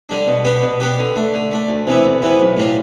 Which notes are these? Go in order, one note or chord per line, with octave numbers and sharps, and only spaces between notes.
D3 G3 D4
B2
B3 D4 G4 B4
B2
B3 D4 G4 B4
D3
A3 D4
D3
A3 D4
D2
C3 E3 B3 E4
D2
C3 E3 B3 E4
B1
A2 G3 D4 F4